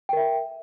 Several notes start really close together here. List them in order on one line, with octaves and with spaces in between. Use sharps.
G5 A#4 E5